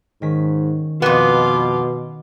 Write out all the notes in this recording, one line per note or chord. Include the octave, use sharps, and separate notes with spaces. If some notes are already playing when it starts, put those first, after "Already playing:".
G#2 D#3 C#4 B6
F2 B2 B3 F4 D#5 D6